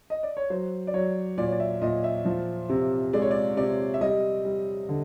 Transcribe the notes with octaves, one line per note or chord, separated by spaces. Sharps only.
D#5
D5
C#5
F#3 C5
D5
F#3 C#5
A#2 D5
C#5
D5
E5
A#2 D#5
E5
F3
C3
G#3 D5
C#5
D5
C3 D5
E5
G3 D#5
G3
D3